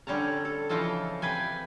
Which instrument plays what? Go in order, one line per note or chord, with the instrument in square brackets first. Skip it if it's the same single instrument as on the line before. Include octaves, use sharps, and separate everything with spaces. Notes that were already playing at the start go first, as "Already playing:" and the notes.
[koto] D3 G3 C#4 A5 A#5
A4
C#3 E3 F3 F4 A4 D#5
C3 B4 G5 G#5